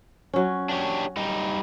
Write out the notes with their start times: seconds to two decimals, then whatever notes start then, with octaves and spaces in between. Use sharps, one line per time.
0.34 F#3 C#4
0.69 D4 G4 C#5
1.17 G3 D#4